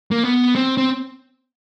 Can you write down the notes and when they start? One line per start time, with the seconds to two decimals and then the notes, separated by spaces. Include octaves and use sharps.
0.11 A#3
0.24 B3
0.55 C4
0.77 C4